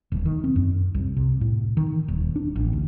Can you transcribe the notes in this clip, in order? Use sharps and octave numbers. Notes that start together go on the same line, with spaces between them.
D#1
D#3
C4
F#2
C2
C3
A2
D#3
D#1
D4
A1
D2